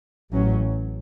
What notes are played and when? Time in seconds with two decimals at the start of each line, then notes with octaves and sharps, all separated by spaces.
0.32 A1 A2 F#3 C#4